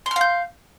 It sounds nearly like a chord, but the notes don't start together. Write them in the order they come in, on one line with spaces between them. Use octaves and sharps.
C6 F6 F5 G6